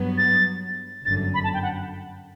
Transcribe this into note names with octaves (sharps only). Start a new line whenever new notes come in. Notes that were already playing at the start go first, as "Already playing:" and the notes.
Already playing: G2 F#3 B3
A6
G1 F#2 D3 A6
B5
A5
G5
F#5